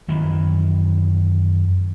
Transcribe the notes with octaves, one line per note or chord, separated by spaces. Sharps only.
F#2 D#3 E3